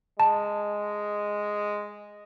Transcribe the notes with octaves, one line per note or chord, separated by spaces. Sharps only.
G#3 A5